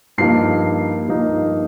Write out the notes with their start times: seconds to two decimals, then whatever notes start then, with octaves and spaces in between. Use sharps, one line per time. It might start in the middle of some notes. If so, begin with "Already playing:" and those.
0.18 G2 F3 A#3 D#4 C7
1.08 G2 F3 A#3 D#4